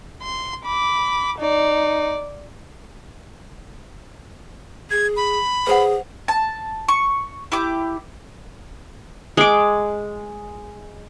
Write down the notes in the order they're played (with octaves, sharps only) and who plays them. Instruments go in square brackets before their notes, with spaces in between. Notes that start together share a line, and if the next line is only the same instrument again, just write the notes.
[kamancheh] C6
B5 D6
D#4 D5
[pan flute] G#4 [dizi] G#6
[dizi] B5
[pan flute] G#4 [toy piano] B4 C5 F#5
[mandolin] A5
C#6
E4 G4 D6
[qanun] G#3 D6